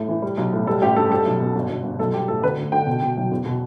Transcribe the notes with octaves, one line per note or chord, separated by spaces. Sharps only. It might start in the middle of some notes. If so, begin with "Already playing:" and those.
Already playing: A2
E3
G3
B1
A2
G3 A4
A1 G4
G2 A4
G3 A4
B1
B2
G1
G1
G1
B1 A4
G3 G4
A2 A4
D3 B4
D2
D3 G5
B2
B2
B1
E2
B2